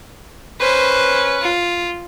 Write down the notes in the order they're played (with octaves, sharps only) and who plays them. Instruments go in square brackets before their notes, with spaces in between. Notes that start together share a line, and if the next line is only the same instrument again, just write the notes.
[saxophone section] C#4 B4 [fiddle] C5
[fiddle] F4